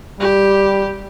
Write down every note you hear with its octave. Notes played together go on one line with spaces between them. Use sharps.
G3 G4